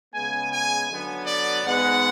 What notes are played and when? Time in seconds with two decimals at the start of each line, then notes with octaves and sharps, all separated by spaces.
0.13 C#3 G#3 B3 G#5
0.51 G#5
0.89 D3 F#3 B3
1.26 D5
1.63 G#2 G#3 B3 F#5